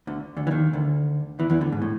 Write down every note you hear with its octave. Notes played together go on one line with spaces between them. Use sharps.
D2 D3
D2 D3
E3
D#2 D#3
D2 D3
E2 E3
E2 E3
D2 D3
G#2
A2